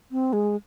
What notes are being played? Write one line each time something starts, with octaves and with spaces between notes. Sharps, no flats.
C4
G#3